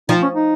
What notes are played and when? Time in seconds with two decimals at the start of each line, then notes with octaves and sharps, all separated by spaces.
0.09 F3 D#4
0.23 C#4
0.34 D#4